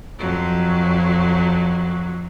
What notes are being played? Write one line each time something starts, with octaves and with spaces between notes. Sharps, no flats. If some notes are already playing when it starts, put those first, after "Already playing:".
F2 F#3